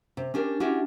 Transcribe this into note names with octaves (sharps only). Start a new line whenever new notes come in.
C3
C#4 D4 G4 A#4
C#4 D4 E4 F#4 G4